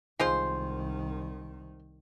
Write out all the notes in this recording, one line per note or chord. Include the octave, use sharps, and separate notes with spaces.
C2 D#3 G#3 F4 C5